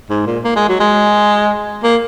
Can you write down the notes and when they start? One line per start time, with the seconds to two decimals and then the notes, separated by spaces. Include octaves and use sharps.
0.10 G#2
0.27 A#2
0.44 A#3
0.56 G#3
0.69 F#3
0.80 G#3
1.83 A#3